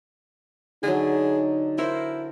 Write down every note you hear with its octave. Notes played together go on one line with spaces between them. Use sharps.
D3 F#3 D#4 G#4
E4 A#4 C5